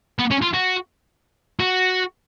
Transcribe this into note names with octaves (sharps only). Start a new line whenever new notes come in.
B3
C#4
F4
F#4
F#4